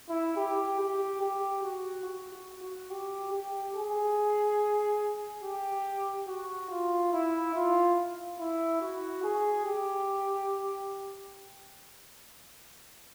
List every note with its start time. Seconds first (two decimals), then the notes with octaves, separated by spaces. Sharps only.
0.09 E4
0.37 G4
0.79 G4
1.21 G4
1.64 F#4
2.06 F#4
2.34 F#4
2.63 F#4
2.91 G4
3.32 G4
3.75 G#4
5.44 G4
6.28 F#4
6.70 F4
7.13 E4
7.55 F4
8.39 E4
8.81 F#4
9.23 G#4
9.65 G4